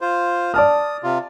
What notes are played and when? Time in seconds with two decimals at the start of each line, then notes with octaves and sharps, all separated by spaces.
0.01 F4 C5
0.54 D5 A5 D#6 F6
1.03 C3 F4